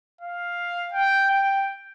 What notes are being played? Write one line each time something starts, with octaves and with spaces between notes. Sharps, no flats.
F5
G5
G5